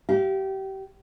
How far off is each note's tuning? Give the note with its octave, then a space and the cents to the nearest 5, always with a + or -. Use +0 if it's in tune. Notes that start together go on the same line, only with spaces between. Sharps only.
G4 -25 F5 -35